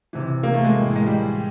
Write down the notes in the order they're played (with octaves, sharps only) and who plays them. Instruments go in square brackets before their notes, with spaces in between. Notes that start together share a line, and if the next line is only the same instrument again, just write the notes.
[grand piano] C3 E3
A#3
A3
G#3
A2 E3
G#3
G3